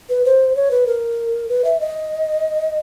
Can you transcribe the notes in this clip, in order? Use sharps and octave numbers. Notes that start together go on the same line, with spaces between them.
B4
C5
C#5
B4
A#4
B4
E5
D#5